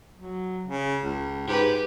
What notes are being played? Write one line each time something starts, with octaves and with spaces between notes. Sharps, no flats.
F#3
C#3
C#2
G#2 G4 B4